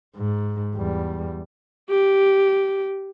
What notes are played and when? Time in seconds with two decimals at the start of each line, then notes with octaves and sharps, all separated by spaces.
0.16 G#2
0.75 E2 G3
1.90 G4